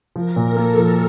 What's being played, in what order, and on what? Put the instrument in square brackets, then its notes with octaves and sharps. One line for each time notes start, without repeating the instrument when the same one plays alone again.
[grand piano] F3 [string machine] A#4
[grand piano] A#2
[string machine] A4
[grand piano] A#3
F3